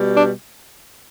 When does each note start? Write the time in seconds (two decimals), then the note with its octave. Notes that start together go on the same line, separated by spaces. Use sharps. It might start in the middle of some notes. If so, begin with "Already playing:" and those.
Already playing: B2 G3
0.14 D4